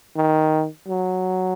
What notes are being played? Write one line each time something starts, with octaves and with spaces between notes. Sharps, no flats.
D#3
F#3